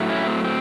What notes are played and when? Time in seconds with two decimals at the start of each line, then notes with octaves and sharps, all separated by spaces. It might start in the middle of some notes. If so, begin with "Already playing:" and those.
Already playing: A2 F#3 A3
0.09 C#4 E4
0.27 C4
0.44 C4